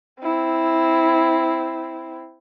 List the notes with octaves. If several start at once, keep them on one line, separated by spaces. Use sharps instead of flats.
C4 E4